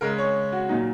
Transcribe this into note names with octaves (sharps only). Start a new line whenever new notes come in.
C#3 G#3 A#4
C#5
F#4
A#2 F#3 D#4